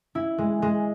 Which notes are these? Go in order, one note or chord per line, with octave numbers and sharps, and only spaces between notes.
E4
G#3
G#3